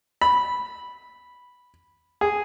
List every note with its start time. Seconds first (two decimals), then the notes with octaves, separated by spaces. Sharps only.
0.21 B5
2.21 G#4